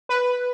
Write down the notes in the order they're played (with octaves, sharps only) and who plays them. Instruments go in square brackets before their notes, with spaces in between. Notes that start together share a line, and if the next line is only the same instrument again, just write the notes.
[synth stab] B4